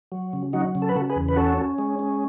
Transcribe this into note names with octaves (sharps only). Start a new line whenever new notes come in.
F#3
C#3
F#3 D#4 F#4
C#3
A4
B4
C#3 F#4 A4
G#4 B4
E2
B4
C#4 F#4 A4
C#4
G#3
C#4